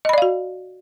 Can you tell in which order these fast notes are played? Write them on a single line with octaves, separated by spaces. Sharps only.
D#5 B5 D5 F5 F#4